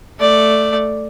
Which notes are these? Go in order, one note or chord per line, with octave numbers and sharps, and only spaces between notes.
A3 D5